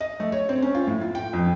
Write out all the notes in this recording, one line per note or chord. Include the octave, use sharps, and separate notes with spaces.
D#5
A3
C#5
C4
C#4
F4
A2
F4
G5
F2